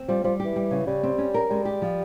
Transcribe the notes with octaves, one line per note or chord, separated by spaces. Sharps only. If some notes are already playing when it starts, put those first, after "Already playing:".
Already playing: C4
F3 G3
F3 G3
G4
E3
G3
C#3
C#3 G3
C4
C#4
A#4
G3 G#3
G4
F3